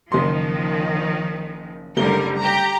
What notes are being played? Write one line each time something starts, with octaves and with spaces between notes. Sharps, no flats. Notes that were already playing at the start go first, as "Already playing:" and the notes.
F#1 D#3 F3 C6
F#1 D3 G3 A3 A#4 G7
G4 A#5